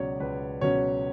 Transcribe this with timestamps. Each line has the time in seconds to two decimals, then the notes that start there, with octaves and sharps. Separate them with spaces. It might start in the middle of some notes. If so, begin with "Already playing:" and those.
Already playing: C#2 B2 F#3 C#4 C#5 D5
0.20 C#2 B4
0.61 B2 F#3 C#4 C#5